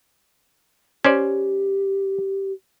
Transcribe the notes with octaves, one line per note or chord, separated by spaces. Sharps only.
C#4 G4 C5 D5